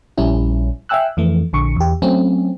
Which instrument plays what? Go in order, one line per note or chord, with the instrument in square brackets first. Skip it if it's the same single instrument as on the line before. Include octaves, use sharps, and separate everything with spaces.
[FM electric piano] A#1 G3 C#4 E4
E5 F5 G5 G#5 E6 F#6
F2 E3 A3
A#1 D3 C#6
E2 G4
F#3 A3 C4 C#4